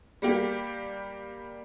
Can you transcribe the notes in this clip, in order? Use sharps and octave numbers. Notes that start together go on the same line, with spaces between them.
G3 A#3 G4